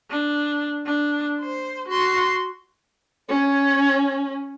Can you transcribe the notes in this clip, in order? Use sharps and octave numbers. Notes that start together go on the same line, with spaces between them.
D4
D4
C5
F#4 C6
C#4 C#5